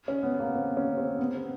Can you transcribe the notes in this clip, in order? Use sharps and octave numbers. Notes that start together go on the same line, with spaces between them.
C#4
B3
A#3
C4
C#4
C4
B3
C4